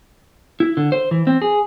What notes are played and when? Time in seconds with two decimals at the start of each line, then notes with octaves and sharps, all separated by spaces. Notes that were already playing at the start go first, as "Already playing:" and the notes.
0.60 E4
0.77 D3
0.92 C5
1.11 E3
1.27 C4
1.42 G#4